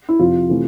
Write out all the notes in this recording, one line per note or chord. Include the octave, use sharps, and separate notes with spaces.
E4
F2 C3 F3 F4
C3 E3 A3